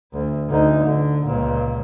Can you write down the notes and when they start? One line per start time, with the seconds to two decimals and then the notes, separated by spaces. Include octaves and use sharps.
0.13 D2
0.49 D2 D#4
0.84 D3
1.26 C#2 A#2